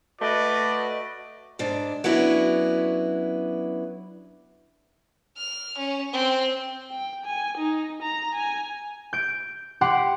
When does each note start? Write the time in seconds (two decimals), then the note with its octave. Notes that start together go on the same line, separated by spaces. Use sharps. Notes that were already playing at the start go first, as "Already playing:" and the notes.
0.21 A3 F#4 B4 D5 D#5
1.59 G#2 D4
2.04 F#3 B3 C#4 D4 E4
5.37 F6
5.78 C#4
6.13 C4
6.91 G5
7.26 G#5
7.57 D#4
8.02 A#5
8.35 G#5
9.13 G6 D7
9.81 G4 F#5 C6 D6